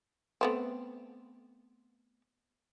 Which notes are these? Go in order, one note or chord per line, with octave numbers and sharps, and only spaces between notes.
A3 B3 C4